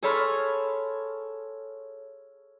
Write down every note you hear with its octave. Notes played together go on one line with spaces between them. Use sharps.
G#4 A4 C#5 B5 C6 F6